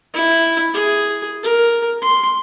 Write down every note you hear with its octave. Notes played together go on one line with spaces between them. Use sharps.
E4
G#4
A#4
C6